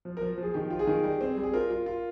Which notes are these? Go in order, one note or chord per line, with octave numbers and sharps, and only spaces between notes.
F3
F3 A#4
F3 G#4
D#3 G4
F4
G#4
D#3
G3
C4
G3
G#4
F4 A#4
F4
F4